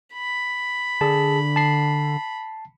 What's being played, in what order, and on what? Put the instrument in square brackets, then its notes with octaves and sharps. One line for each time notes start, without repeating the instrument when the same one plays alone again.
[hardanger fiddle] B5
[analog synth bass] D3 [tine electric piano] G#4 A5
[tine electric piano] A5 C7